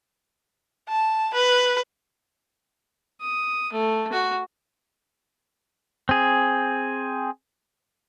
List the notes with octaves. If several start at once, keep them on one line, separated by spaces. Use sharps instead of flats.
A5
B4
D#6
A3
F#4
C4 G#4